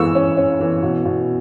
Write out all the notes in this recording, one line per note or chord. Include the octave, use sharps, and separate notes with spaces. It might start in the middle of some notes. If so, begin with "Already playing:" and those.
Already playing: E3 G#3 C#6 E6
C#4
C#4
E3
B2
B2